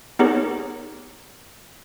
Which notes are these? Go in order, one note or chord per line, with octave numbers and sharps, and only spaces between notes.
B3 D#4 G4 G#4 A#4 C#5